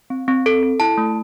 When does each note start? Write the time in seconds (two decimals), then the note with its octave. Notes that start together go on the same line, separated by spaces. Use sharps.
0.10 C4
0.28 C4
0.46 A4
0.63 A4
0.80 E4 A5
0.98 A3